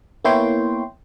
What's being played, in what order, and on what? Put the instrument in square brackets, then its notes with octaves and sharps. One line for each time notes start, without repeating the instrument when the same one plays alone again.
[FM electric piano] A#3 B3 E4 C#5 G5 C6